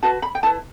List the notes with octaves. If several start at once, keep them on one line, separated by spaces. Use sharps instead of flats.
F#4 B4 A5
B5
G5
E4 B4 A5